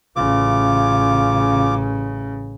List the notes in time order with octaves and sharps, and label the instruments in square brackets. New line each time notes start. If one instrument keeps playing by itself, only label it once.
[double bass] A1 C#3 [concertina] F4 D6